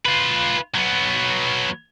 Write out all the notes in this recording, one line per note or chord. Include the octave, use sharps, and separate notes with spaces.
F4 B4
F#3 B3